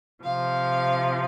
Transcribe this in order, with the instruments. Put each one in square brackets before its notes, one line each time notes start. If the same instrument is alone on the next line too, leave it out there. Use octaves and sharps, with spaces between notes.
[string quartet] C3 F3 F5